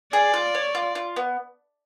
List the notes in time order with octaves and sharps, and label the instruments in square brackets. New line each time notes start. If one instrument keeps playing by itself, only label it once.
[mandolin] G#4 [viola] D5
[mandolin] F4
C#5
F4
F4
B3